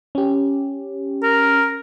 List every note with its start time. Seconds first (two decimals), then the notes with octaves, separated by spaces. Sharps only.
0.15 C#4 G4
1.23 A#4